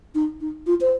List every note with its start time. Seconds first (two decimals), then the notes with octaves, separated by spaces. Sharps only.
0.15 D#4
0.41 D#4
0.67 F4
0.81 C5